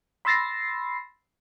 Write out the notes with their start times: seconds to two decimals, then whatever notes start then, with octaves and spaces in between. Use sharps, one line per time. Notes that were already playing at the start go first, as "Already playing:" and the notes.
0.25 B5 C6 E6 A6 A#6 C7